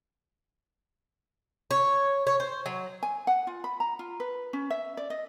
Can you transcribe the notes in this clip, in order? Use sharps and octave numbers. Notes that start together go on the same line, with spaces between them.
C#5
C#5
C5
F#3
G#5
F#5
F4
B5
A#5
F4
B4
C#4
E5
D5
D#5